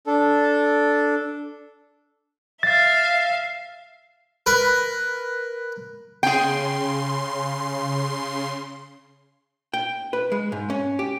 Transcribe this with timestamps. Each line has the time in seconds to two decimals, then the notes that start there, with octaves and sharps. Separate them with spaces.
0.07 D4 A4
2.63 E5 F5 A6
4.46 A#4 B4
6.23 C#3 G#4 G5 C6
9.74 G5
10.13 B4
10.32 G#3
10.52 G#2
10.70 C#4
10.99 G4